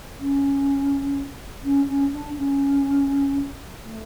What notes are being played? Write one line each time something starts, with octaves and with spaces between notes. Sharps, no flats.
C#4
C#4
C#4
D4
C#4
A3